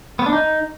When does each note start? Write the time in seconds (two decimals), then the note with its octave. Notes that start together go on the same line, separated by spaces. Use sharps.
0.19 B3
0.26 D4
0.33 D#4